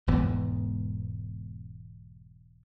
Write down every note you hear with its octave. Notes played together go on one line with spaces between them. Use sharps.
E1 G#2 E3 B3